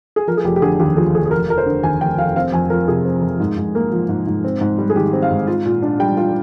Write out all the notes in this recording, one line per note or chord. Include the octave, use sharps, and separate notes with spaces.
G#4
F3 A#4
G#4
F1 G4
G4
D3 G#4
D#2 G4
F3 G#4
F1 G#4
G#4
F1 A#4
F1 A#4
C5
D3
D#2 G#5
F1 G5
F1 F5
C4 F5
F2 G#5
F3 A#4
C3 G#4
C4
F2
G#2
G#2
A#3
F3
G#2
G#2
C4
G#2
G3
G#4
D#3 G4
C4
F5
G#2
F4
A#2
D4
G3 G5
F4